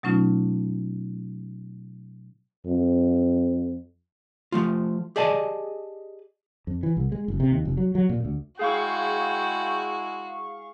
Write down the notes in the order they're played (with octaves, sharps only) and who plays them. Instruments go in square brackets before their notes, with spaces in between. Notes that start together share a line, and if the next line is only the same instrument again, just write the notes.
[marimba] B2 F#3 A3 C#4 D#4 F4
[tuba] F2
[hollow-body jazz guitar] F3 A3 F4
G4 G#4 D5 D#5 G#5 A5
[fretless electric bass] F2
E3
C2
G#3
F#1
C3
D#2
F1
F#3
F#3
A#2
D2
[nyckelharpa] G#3 E4 [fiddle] F#4 [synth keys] G#4 F5 C#6 [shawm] G5